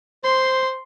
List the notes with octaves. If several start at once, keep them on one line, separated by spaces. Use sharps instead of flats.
C5 C6